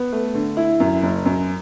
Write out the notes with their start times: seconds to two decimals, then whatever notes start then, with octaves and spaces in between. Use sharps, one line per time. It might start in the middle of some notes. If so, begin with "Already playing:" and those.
Already playing: B3
0.12 A3
0.35 D3
0.57 E4
0.80 F#2
1.02 F#1
1.26 F#2